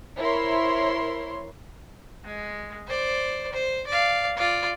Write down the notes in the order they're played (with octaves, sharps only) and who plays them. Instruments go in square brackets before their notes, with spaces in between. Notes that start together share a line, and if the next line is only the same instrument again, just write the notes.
[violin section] E4 A#4 C5 C#5 C6
[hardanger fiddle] G#3
C5 D5
C5
D5 F5
F4 D5